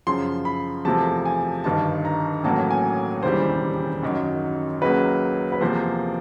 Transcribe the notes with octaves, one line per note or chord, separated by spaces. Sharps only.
F#2 C#3 F3 C6
B5
E2 C3 F3 A3 A5
G#5
G1 G2 D#3 A5
A#5
A1 A2 F#3 A#3 A5
G#5
E1 D#2 C#3 E3 G3 C5
G#1 F#2 D#3 F#3
C#2 C#3 F#3 A#3 B4
B4
E2 C3 F3 A#3 C5